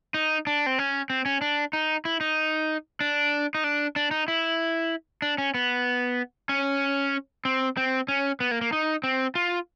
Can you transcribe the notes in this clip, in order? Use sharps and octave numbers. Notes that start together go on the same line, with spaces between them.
D#4
D4
C4
C#4
C4
C#4
D4
D#4
E4
D#4
D4
D#4
D4
D4
D#4
E4
D4
C#4
B3
C#4
C4
C4
C#4
B3
A#3
A#3
D#4
C4
F4